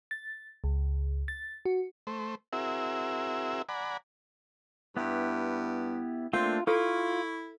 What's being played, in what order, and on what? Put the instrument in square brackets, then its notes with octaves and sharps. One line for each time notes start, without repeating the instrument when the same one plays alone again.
[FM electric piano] A6
C#2
A6
F#4
[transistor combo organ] A3 C5
C4 E4 F#4 G#4 A#4 E5
D5 F#5 G#5 A#5 B5
[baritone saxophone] G2 [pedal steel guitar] B3 E4 G4
[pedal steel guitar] A3 A#3 D4 [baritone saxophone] C4 [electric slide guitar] F4
[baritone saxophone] E4 [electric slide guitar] F4 [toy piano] A4 [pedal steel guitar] C#6 F6